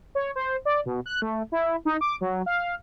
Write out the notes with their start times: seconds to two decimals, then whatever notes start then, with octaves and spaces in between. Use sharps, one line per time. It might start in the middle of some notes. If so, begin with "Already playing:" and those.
0.15 C#5
0.36 C5
0.65 D5
0.86 B2
1.06 F#6
1.22 A3
1.52 E4
1.85 D#4
2.01 D6
2.21 F#3
2.46 F5